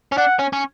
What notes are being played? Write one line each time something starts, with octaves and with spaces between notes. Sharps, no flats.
C#4
D4 F#5
C#4
C#4